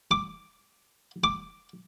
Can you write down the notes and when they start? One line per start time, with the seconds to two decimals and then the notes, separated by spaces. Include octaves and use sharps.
0.11 D6
1.24 D6